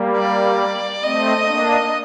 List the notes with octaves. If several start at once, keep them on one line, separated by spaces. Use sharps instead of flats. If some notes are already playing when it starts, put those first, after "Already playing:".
Already playing: G3 A#3
D5
A3 C4 D#5
A#3 D4